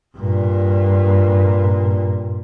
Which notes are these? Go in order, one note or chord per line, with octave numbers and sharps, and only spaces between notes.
G2 A#2